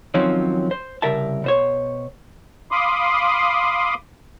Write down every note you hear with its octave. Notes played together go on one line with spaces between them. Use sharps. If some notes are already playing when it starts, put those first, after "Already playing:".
D#3 F3 F#3 C4 C#4
C5
C2 C#3 G3 A#4 E5 A5
B2 C5 C#5
F5 B5 C6 D6 D#6